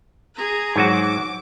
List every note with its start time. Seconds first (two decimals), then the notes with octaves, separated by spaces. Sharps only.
0.36 G#4 A#5
0.76 G#2 F#3 F#4 D6